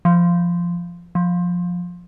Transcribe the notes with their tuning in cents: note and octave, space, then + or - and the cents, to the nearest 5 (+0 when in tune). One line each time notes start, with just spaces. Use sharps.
F3 -10
F3 +15